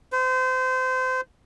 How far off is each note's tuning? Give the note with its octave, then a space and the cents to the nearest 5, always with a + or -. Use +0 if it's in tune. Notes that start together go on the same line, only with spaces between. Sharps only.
C5 -30